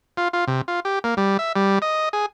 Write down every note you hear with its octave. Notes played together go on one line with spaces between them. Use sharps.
F4
F4
C3
F4
G4
A#3
G3
E5
G3
D#5
G#4